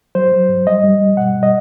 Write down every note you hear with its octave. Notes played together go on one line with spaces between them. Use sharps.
F#3 C5
F#3
G2
G3 D#5
G3
G3
B2 F#5
G3
D#5